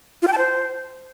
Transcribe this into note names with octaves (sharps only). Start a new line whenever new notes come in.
F4
G5
A5
C5